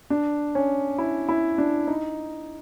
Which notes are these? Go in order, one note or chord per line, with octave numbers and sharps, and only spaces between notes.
D4
C#4
E4
E4
D4
D#4